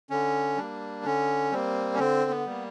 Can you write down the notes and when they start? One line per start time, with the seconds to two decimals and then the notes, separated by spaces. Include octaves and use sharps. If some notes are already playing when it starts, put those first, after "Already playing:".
0.10 D3 C#4
0.57 G3 A#3 D4
1.05 D3 C#4
1.51 G3 A#3 C4
1.94 C#4
1.99 D3 C4
2.30 B3
2.46 G3 A#3